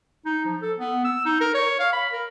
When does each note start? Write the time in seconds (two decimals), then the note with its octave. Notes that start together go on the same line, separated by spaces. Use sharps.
0.25 D#4
0.45 F3
0.62 A4
0.79 B3
1.05 E6
1.25 D#4
1.41 A#4
1.54 C#5
1.79 F5
1.93 B5
2.12 A#4